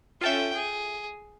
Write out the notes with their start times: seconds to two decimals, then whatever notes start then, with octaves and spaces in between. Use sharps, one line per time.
0.21 C#4 F4 A4 E5 G5
0.55 G#4